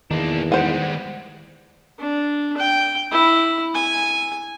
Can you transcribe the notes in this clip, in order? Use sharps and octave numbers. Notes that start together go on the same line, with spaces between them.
E2 D#3 A#3 D4
G3 G#3 C5 F#5
D4
G5
E4
G#5